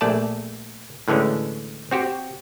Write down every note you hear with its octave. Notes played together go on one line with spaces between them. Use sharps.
A#1 A3 D5 A5
A2 D3 E3 G#3 C#4
C4 F#4 G4